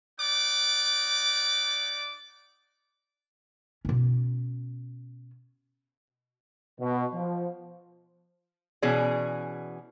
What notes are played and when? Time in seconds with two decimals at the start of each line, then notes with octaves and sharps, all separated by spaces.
0.18 D#4 D5 F#5 D6
3.85 B2 C#4
6.79 B2
7.13 F3
8.82 B2 E3 C#4 G#4 D5